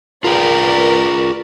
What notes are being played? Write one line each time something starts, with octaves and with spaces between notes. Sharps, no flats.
F4 G#4 A#4 B4 D5 G5